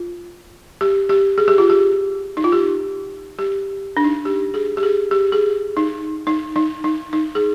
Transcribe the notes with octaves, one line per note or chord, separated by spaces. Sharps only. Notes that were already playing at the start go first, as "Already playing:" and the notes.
Already playing: F4
G4
G4
G#4
G4
F4
G4
D#4
F4
G4
G4
D4
D#4
G4
G#4
G4
G#4
G4
G#4
D#4
D#4
D#4
D#4
D#4
G#4